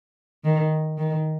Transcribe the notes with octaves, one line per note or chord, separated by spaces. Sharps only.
D#3
D#3